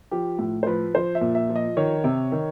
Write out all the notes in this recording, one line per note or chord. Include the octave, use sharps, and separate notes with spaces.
F3 G4
A2
C5
F3 B4
F3 C5
E5
A#2
E5
F3
D#5
D#3 C#5
C3
D#3